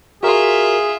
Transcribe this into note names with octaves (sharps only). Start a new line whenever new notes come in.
F4 F#4 G#4 A#4 E5